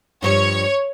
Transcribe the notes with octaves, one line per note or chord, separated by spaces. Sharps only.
G2 F3 G3 C#5